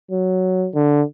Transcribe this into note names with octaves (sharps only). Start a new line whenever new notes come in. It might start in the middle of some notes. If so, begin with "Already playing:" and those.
F#3
D3